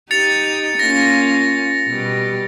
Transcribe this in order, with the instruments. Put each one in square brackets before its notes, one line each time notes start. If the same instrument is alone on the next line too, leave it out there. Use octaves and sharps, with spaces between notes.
[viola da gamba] D#4 G4 [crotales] A6 C#7 F7
[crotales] F7
[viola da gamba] A#3 C#4 F4 [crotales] A#6
[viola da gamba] B2 G3 G4